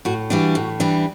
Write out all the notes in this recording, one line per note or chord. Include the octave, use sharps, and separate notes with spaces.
A2 F#4
E3 G3 D4 F#4
A2
E3 G3 D4